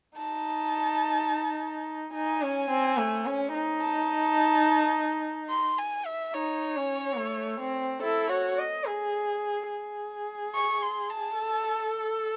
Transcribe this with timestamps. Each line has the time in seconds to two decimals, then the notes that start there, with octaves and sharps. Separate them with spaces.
0.17 D#4 A5
2.14 D#4 G#5
2.42 C#4
2.70 C4
2.98 A3
3.26 C#4
3.54 D#4
3.81 A5
5.50 C6
5.79 G#5
6.06 E5
6.34 D#4 C#5
6.76 C#4
7.18 A3
7.60 C4
8.03 E4 A4
8.30 F#4 C#5
8.58 D#5
8.86 G#4
9.71 G#4
10.55 C#6
10.82 C6
11.10 A5
11.38 A4